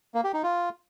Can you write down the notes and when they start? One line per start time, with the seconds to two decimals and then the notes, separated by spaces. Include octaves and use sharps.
0.14 A#3
0.24 G4
0.34 D#4
0.43 F4